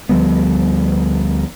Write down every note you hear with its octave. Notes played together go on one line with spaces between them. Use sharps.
D2 F3 G3 B3